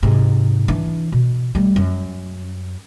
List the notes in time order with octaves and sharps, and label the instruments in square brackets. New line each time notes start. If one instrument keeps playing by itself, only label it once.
[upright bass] G#2 C3
E3 D4
B2
G3 A3
F#2